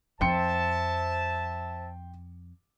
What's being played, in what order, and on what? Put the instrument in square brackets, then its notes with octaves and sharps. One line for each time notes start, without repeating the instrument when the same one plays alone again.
[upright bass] F2 [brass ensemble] C5 E5 A5 [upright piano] G5 C6 C#7